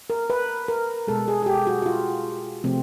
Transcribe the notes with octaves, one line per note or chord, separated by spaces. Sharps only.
A#4
B4
A#4
B2 G#3 A4
G#4
G#4
G4
F#4
F#4
F4
C3 F3 A3 C4